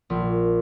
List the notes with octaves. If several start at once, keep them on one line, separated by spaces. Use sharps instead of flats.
A#1